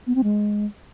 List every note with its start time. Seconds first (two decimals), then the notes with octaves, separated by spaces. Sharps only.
0.07 B3
0.15 C4
0.24 G#3